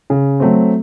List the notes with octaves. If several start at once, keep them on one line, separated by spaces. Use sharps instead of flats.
C#3
F#3 A3 C4